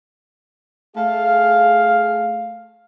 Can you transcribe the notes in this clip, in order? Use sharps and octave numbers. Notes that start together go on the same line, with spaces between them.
A3 G#4 F5